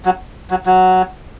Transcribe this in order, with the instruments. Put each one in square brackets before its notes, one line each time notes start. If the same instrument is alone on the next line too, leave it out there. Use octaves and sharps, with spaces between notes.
[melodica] F#3
F#3
F#3